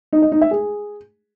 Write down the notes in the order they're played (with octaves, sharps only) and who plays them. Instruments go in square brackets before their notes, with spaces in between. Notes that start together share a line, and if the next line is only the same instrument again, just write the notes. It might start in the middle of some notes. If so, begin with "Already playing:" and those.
[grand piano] D#4
D#5
D#4
E5
G#4